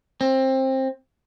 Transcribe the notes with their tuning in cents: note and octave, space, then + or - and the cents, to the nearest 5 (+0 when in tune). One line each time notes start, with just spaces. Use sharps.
C4 +20